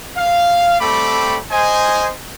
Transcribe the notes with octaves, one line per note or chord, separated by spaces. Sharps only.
F5
G3 A3 C4 A4 B5 D6
C5 D#5 G#5